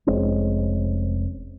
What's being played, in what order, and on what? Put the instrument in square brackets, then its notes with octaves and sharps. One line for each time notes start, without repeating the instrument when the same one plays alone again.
[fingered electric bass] F1 G#3 C4 C#4